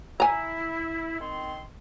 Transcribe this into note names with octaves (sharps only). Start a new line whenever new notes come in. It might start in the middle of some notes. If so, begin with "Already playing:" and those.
E4 G#5 A#5
D#3 C4 C6